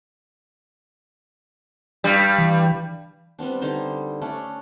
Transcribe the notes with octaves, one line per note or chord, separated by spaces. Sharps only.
G2 G3
E3
G3 B3 C4 D4
D3 G3 D#4 C5
A3 C#4 D4